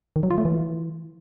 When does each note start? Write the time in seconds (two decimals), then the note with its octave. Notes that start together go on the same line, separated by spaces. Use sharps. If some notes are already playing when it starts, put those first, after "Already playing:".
0.16 D#3
0.23 F#3
0.31 F4
0.38 A3
0.45 E3